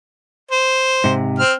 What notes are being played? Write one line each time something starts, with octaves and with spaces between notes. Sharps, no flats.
C5
G#2 C3
C4 F6